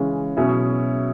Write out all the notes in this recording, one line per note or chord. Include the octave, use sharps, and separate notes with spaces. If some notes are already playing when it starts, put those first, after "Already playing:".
Already playing: C#3 E3 G#3 C#4
B2 F#3 C#4 E4 G#4